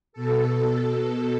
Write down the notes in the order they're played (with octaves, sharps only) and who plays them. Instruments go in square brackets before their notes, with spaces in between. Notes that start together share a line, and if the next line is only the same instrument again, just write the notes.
[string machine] B2 A4